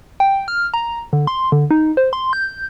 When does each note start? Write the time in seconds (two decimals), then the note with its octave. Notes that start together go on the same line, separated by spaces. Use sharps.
0.20 G5
0.48 F6
0.74 A#5
1.13 D3
1.27 C6
1.52 D3
1.71 D#4
1.97 C5
2.13 C6
2.33 G6